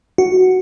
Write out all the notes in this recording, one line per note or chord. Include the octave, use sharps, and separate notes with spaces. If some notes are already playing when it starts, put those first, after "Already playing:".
F#4